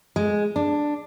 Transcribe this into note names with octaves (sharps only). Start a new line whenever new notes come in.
G#3
D4